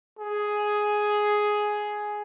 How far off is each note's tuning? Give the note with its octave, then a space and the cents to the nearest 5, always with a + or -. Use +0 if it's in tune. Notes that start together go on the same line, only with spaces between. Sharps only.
G#4 +5